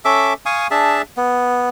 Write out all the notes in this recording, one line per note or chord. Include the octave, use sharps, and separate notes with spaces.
C#4 A4 E5 D6
F5 G#5 C#6 D#6
D4 G#4 E5 A5
B3